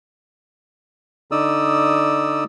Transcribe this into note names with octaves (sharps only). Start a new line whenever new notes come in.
D3 D#4 D5 D#6 E6